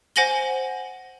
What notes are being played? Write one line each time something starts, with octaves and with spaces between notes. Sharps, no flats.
C5 F#5 G#5 A#6 F#7 G7